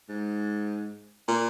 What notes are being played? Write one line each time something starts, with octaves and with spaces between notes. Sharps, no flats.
G#2
A#2